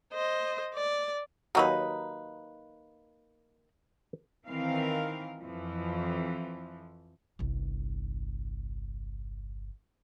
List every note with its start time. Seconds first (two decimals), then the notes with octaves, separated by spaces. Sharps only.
0.13 C5 D#5
0.74 D5
1.55 D#2 F#3 A#3 D#4 F#4 B4
4.48 D#3 E3 C4 A#4 F5
5.40 F2 E3 F3
7.39 G1 C2